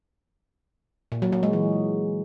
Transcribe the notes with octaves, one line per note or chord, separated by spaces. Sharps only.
A#2
F#3
F#3
G#3
E3